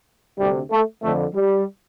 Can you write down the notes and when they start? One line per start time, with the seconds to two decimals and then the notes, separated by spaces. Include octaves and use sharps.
0.38 D2 C3 G3
0.71 A3
1.03 F2 D3 A3
1.34 G3